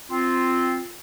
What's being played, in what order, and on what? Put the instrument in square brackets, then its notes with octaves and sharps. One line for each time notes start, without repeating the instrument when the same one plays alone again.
[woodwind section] C4 F4